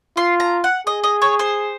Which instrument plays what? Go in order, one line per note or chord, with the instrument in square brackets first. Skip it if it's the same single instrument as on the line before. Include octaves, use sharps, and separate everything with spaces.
[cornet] F4 [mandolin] C6
[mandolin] A#5
F#5
[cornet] G#4 [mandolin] D#5
[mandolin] D#5
C#5
C5